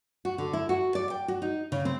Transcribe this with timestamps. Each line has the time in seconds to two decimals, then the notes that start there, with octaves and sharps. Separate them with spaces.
0.25 F#4
0.38 D3
0.53 E4
0.69 F#4
0.95 D5
1.10 G5
1.28 F#4
1.42 D#4
1.72 C#3
1.85 C4